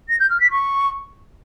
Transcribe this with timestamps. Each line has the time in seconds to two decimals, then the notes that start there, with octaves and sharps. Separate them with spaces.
0.08 A#6
0.19 G6
0.29 F6
0.40 B6
0.50 C#6